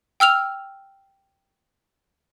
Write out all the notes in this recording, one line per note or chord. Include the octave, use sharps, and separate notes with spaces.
G5 E6 F6 F7